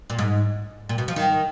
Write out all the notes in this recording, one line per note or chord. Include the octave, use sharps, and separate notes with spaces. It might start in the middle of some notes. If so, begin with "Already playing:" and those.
A#2
G#2
A#2
B2
F3
D#3